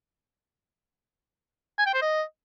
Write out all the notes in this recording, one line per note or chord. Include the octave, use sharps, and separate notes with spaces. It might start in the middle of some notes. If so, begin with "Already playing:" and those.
G#5
G5
C5
D#5